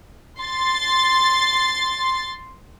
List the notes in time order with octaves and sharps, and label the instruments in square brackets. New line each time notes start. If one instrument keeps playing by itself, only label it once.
[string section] C6 A6